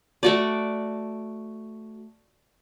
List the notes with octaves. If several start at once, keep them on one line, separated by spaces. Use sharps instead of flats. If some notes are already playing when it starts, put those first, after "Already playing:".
A3 F#4 D5